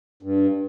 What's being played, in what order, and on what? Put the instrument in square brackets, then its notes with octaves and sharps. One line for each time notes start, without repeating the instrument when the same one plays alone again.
[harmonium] G2